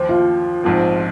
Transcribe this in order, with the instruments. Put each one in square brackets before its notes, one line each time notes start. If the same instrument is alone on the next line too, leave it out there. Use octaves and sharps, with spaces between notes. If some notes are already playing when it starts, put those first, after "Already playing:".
Already playing: [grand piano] D#2 F3 [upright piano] C5
[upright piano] F4
[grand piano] A#1 G#2 F3 C4